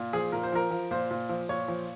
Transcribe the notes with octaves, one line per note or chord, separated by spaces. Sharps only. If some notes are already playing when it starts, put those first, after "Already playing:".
Already playing: A#2
F3 G#4
A#2 A#4
C5
F3 A#4
F3
A#2 C5
A#2
F3
A#2 C#5
F3